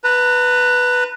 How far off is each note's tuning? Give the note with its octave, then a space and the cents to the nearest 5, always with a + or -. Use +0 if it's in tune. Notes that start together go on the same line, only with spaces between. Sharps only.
B4 +0 A#5 -40